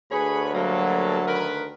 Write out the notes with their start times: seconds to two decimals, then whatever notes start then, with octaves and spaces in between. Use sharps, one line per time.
0.11 D2 G#4 B4 C#5 B5
0.55 F#3 G3 A#3 A4
1.27 D#3 A#4 B4